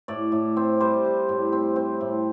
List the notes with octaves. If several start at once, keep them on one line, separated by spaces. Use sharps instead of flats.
A2 D5
A2
C4
G3 C5
G3
A2
C4
C4
A2